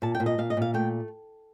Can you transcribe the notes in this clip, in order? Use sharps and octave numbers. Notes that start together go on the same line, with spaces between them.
A#2 A5
G5
A#2
D#5
A#2 F5
D#5
A#2 F5
A3 G5